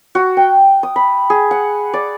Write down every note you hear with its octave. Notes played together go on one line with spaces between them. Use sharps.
F#4
G5
D#6
B5
G#4
F#5
D5